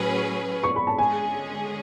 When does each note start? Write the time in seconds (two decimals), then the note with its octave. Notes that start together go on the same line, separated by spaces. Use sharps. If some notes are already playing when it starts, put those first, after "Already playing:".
Already playing: A2 F#3 C#4 G#4 B4
0.63 C#6
0.76 B5
0.87 A5
0.98 D3 G#3 C#4 G#4 G#5